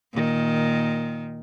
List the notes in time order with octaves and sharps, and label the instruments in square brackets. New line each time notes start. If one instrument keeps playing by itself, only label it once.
[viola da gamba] A#2 D#3